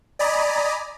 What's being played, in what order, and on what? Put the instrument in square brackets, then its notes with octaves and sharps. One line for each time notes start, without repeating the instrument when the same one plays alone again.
[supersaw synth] D5 D#5 G#5 A#5 B5